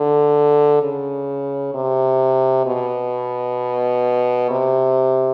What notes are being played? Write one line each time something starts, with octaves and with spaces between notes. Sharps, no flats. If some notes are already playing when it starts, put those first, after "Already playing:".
Already playing: D3
C#3
C3
B2
C3